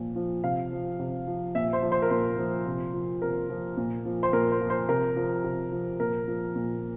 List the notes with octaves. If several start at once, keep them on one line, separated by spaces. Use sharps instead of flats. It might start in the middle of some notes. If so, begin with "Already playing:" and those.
Already playing: A#2 F3
F3
C3 F5
F3
C3
F3
A#2 E5
C5
F3
C5
A#4
A#2 C5
F3
C3
F3
C3 A#4
F3
A#2
F3
C5
A#2 A#4
C5
F3
C5
C3 A#4
F3
C3
F3
A#2 A#4
F3
A#2